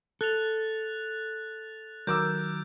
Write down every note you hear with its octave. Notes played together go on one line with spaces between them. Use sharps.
A4 F#6 A6 F7
D#3 F#3 A#4 D6 E6 G6